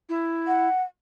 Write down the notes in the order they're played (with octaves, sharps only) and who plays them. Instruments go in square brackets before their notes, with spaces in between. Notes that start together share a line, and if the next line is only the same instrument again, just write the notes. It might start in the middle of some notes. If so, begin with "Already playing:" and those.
[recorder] E4
[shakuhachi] F#5